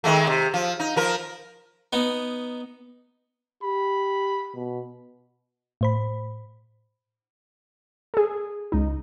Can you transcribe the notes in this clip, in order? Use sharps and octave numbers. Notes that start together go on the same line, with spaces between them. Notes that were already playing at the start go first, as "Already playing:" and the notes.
D#3 G#3 A3
C3
F3
D#4
F3 A#4
B3 D#4
G4 B5
B2
A2 C5 B5
G#4 A4
C#2 D#4